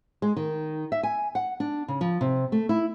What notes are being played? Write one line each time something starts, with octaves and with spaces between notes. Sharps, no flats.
G#3
D#3
E5
G#5
F#5
D4
C#3
F3
C3
A3
E4